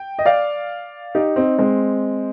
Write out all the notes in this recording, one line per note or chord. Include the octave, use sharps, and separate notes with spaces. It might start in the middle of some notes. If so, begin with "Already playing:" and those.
Already playing: G5
D#5
D5 F5
D#4 G4
C4 D#4
G#3 C4